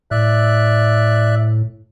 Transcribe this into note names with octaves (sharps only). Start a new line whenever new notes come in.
A2 D5 E5 F#6